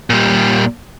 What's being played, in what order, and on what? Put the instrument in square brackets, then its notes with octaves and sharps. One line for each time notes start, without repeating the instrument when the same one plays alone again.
[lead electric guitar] A#2 G3